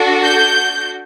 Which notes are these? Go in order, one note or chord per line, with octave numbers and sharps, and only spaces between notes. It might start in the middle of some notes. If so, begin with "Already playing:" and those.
Already playing: D4 F#4 A4
G6